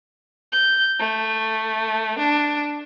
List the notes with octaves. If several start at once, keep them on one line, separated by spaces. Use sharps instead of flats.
G6
A3
D4